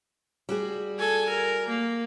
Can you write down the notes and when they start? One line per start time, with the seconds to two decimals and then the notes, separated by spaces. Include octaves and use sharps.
0.49 G3 F#4 G#4
0.98 A4 G#5
1.29 A#4
1.68 A#3